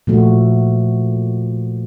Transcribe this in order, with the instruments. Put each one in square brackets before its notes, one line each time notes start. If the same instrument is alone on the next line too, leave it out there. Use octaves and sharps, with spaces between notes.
[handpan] A#2 F3 A3 F#4